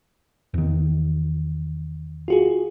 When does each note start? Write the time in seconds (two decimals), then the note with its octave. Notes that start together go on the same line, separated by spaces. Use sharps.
0.54 E2 D#3
2.28 F4 F#4 G#4